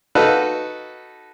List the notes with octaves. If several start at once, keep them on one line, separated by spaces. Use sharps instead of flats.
D#4 F#4 A4 B4 F5